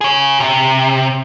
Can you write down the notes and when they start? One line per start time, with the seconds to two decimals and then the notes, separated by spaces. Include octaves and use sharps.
0.01 G#4 C#5
0.40 C3